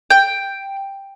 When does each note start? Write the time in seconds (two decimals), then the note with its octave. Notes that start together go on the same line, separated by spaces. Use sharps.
0.10 G5